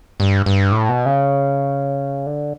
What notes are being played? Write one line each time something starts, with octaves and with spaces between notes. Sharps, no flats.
G2
G2
A2
B2
C#3
D3